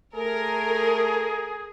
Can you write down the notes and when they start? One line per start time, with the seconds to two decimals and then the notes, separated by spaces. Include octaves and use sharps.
0.15 A3 G#4 A#4